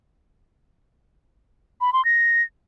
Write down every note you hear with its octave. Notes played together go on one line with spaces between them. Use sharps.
B5
C6
A#6